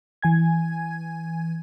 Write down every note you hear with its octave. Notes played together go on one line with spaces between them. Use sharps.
E3 G#5 G#6